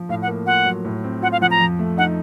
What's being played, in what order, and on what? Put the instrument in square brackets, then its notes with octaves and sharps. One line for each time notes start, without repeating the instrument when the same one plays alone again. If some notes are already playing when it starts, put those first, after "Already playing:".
Already playing: [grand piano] F3
[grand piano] A2 [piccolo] F5
[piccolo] F#5
[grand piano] A#3
[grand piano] F4 [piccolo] F#5
[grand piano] F#3
A2
C4
[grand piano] F4 [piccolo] F#5
[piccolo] F5
[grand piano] F3 [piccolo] F#5
[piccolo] A#5
[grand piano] F2
A3
[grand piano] D#4 [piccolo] F#5